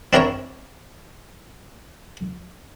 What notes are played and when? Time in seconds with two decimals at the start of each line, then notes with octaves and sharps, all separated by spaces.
0.13 C4 D4 E4 A#4 C#5 A#5